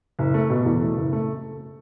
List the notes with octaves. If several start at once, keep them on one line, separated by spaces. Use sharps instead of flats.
F#1
A3
B2
E2
A3
F#1
A3